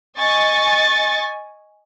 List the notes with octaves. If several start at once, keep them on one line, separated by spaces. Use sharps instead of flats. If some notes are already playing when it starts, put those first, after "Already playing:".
D#5 G#5 C#6 A6